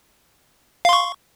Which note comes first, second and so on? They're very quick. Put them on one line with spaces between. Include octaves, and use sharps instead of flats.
F5 C6 C#6